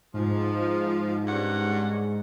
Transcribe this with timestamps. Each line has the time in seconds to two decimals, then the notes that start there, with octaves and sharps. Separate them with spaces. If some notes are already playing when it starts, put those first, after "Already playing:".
0.14 G#2 F3
1.27 G2 C#4 F#5